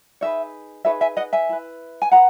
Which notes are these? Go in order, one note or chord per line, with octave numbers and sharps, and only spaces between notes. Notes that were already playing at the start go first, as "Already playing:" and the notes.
D#4 G#4 B4 C#5 E5
D#4 G#4 B4 C#5 E5
E5 G#5
D#5 F#5
E5 G#5
E4 B4
G#5
G#4 B4 F#5 A#5